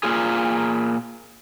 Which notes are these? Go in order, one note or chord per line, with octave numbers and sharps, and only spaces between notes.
A#2 A#3 F4 G#4